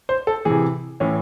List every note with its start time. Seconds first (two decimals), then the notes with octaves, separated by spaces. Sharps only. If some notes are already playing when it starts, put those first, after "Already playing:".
0.09 C5
0.27 A4
0.45 C3 E3 G#4
1.00 A2 E3 C#4